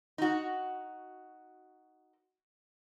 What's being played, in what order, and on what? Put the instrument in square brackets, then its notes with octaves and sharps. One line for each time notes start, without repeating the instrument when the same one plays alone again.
[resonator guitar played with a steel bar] D#4 F#4